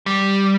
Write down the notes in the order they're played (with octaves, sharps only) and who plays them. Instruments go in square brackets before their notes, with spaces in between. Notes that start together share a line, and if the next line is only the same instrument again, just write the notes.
[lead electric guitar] G3